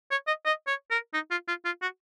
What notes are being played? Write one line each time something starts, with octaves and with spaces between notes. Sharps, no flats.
C#5
D#5
D#5
C#5
A#4
D#4
F4
F4
F4
F#4